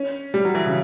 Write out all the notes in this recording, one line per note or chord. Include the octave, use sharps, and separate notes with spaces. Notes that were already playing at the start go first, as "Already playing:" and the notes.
Already playing: C#4
G3
F#3
E3
C#3